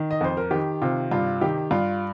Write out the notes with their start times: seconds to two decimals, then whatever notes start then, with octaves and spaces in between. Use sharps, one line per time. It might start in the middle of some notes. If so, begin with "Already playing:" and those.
Already playing: D#3
0.11 D#5
0.21 F2 C5
0.37 A#4
0.51 D#3 G4
0.82 C3 F4
1.11 G2 F4
1.41 D#3 G4
1.71 G2 F4